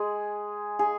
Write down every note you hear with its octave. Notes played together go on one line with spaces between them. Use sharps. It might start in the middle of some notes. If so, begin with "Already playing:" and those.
Already playing: G#3 G#4
G#4